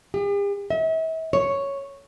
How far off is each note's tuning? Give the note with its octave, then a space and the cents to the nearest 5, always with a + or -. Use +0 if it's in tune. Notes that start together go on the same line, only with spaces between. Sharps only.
G4 +45
E5 -40
C#5 +0